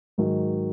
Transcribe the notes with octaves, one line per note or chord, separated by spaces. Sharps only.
G#2 D#3 F#3